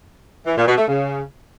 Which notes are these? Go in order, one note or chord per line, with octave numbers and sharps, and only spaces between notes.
E3
A#2
B2
A3
C#3